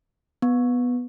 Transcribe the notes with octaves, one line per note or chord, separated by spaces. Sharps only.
B3